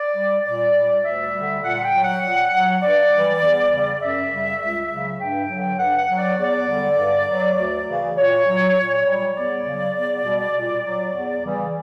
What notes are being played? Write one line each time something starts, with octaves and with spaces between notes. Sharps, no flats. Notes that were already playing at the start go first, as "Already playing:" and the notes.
Already playing: D5
G3
A#2 D5
G3
D2 E5
D3 G3
A#2 F#5
G5
F#3
F#5
A#2
F#3
G2 D5
E3 G3
E2
C#3 G3
F#2 E5
C#3 G3
C#2
C#3 F#3
G2 G5
D3 F#3
G2 F#5
F#5
F#3
D5
E2 D5
D3 G3
G2
F#3
D2
C#3 E3
A#2 C#5
F#3
A#2
G3
E2 D5
C#3 F#3
E2
B2 G3
A#2
F#3
E2
C#3 E3 G3